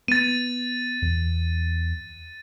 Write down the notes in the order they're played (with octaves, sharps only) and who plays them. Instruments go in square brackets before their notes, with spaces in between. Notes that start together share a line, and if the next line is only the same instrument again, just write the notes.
[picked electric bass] B3 [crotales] A6 D#7
[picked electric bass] E2